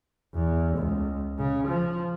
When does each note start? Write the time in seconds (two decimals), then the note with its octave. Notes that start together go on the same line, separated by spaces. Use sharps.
0.35 E2
0.77 C#2
1.38 C#3
1.67 F3